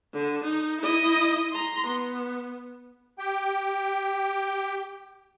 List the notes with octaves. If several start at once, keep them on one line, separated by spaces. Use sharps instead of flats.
D3
D#4
E4 D#5
A#5 C6
B3
G4 G5